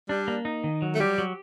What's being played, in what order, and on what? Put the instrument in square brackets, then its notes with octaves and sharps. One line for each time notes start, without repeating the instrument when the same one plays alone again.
[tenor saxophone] G3 [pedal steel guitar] D4
[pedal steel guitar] A#3
D#4
D#3
F#3
[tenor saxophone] A3
[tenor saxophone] G3 [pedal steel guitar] G4
[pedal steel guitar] F#3